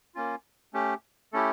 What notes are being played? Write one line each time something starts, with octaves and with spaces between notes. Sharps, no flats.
A#3 C#4 F4
A3 C#4 G4
A3 C#4 E4 G4 A4